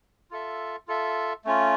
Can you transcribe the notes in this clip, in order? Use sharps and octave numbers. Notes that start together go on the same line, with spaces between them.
F4 A4 E5
F4 A4 E5
A3 C#4 F4